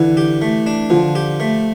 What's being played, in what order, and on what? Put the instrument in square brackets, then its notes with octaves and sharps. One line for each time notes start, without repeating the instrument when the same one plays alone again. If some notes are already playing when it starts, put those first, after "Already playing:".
Already playing: [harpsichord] D3 [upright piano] E3
[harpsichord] G4
A3
D4
[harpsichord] D3 [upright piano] F3
[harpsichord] G4
A3